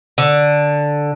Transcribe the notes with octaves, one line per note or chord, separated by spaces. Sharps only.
D3